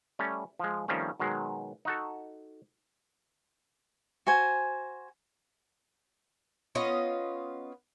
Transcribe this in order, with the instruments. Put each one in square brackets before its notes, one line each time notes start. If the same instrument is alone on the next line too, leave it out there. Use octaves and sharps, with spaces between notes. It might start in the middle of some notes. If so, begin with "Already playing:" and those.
[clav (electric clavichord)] G3 A3 C#4
F3 G#3
D#3 F3 G3 A3 C4 C#4
B2 D#3 F#3 G#3
D#4 F#4 A4
[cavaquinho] F#4 C5 G#5
[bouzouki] B3 C#4 F4 D#5